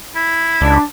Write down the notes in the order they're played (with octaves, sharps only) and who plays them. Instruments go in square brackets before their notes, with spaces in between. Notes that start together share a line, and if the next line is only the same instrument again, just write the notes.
[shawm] E4
[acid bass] C#2 [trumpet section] D4